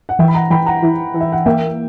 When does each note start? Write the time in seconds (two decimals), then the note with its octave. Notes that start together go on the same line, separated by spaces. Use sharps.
0.09 F#5
0.19 E3 E5 G5
0.28 B5
0.34 F#5 A#5
0.50 E3 G5 B5
0.66 F#5 A#5
0.83 E3
1.14 E3
1.21 E5
1.32 F#5
1.46 A#3 E5 G5